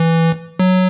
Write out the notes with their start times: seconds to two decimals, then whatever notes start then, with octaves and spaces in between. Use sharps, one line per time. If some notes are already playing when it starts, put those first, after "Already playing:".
Already playing: E3
0.59 F#3